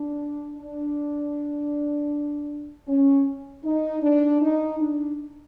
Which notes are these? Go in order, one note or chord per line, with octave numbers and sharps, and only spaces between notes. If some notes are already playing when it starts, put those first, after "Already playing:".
Already playing: D4
D4
C#4
D#4
D4
D#4
D4